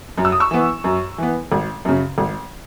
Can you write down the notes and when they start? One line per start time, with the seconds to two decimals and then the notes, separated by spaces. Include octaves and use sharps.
0.18 F#2
0.25 E6
0.32 D#6
0.40 C#6 E6
0.51 E3 B3
0.84 F#2
1.18 E3 B3
1.52 G#1
1.85 F#2 C#3
2.18 G#1